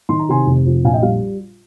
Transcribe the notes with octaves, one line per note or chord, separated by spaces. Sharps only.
D#3 C6
A#5
C3 G#5 C6
F1
F2
A#1 F5 G#5
D#5 G5
G3 F5